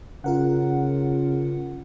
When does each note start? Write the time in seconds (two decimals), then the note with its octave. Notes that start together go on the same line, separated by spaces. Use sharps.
0.24 C#3 F4 A#4 F#5